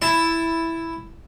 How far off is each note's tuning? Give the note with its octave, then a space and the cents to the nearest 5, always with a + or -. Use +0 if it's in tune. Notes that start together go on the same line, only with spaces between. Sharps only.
E4 +0 A5 +0